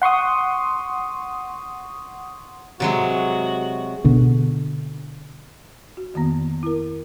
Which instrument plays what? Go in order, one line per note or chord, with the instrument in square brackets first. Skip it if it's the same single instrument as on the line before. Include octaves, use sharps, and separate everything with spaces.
[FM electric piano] F#5 C6 C#6 D#6
[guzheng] C3 F#3 G#3 [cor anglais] F#4
[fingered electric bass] B2 D3
[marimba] F#4
F2 D#3 A#3 B3
E4 A#4